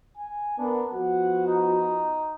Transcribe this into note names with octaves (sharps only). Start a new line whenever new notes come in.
G#5
B3 D4 A#4
F3 B3 F#4 F#5
D#4